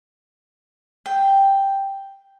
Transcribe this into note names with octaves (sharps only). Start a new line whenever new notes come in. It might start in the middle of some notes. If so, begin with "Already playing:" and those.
G5